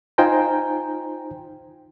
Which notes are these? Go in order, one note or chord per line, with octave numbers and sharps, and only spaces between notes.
D#4 F4 C5 G5 G#5 A#5